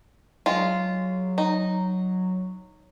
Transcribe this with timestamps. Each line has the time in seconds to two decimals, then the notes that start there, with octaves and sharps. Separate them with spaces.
0.46 F#3 G#3 F4
1.38 D#4